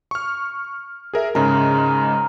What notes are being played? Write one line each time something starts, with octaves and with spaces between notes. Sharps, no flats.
C#6 F6
G#4 A#4 E5
G#2 C#3 G#3 A#4